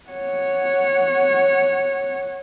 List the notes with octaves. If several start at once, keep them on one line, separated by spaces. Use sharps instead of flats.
C#5 F#5